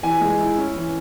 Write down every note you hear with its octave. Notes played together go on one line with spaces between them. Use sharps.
E3 G#5
G#3
E4
C#4
E3